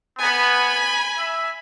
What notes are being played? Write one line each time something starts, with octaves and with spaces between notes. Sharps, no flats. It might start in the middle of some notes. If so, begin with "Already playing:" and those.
B3 G#5 B5
E5